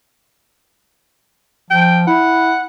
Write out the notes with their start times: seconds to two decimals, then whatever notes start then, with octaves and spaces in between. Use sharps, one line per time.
1.71 F3 G5
2.07 E4 F#5